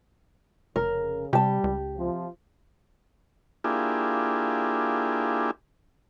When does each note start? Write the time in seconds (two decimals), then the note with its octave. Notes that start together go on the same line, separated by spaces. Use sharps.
0.76 F1 C#3 A#4
1.33 C3 G3 G4 A5
1.64 C#2
1.97 C3 F3
3.64 A#3 D4 E4 F4 G4 G#4